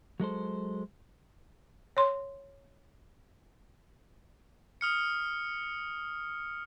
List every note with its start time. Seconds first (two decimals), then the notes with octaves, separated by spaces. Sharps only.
0.20 F#3 G#3 A4 C5
1.97 C#5 C6
4.81 D#6 F6 C#7